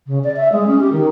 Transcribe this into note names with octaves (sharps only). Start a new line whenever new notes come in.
C#3
D5
E5
G#3
C#4
G4
D#3